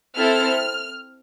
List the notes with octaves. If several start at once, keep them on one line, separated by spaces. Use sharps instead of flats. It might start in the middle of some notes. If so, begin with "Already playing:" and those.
C4 E4 A4 F6